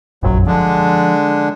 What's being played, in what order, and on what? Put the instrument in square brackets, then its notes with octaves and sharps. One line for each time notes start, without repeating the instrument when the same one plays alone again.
[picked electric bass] F1 A#1 F#2 [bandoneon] F#3
[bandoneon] D3 G#3 D4 [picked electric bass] F3